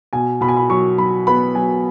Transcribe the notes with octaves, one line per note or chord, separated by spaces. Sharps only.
B2 G#5
B2 B5
G#5
B5
F#3 C#6
F#3 B5
B3 B5
F#3 G#5